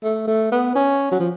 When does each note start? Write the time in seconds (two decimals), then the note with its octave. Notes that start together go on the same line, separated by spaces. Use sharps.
0.04 A3
0.27 A3
0.52 B3
0.75 C#4
1.12 F#3
1.20 F3